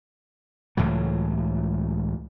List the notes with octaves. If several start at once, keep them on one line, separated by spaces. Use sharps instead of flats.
C#2 A2 E3 F#3